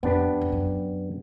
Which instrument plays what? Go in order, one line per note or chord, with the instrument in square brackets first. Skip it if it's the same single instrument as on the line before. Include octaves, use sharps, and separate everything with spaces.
[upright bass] F2 [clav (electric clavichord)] B3 D4 G4 B4
[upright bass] F2
F#2